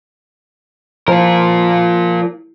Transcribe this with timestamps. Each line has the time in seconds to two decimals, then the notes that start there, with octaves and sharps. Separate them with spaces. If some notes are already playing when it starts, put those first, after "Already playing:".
1.08 F3 F4 A#4